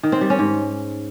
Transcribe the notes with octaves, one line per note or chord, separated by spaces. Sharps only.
D#3
C4
G3
C#4
G#2